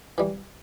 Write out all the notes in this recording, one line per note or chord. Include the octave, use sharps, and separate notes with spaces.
E3 G3